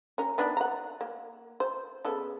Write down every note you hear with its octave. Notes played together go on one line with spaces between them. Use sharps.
C#4 A#4
D#3 B3 D4
F#5 A#5
A#3
C5
C#3 B3 A4